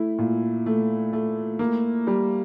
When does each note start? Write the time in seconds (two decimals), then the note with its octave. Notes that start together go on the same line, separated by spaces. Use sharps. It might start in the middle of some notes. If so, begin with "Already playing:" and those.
Already playing: A3 E4
0.18 A#2
0.66 A3
1.13 A3
1.59 A#3
2.07 G3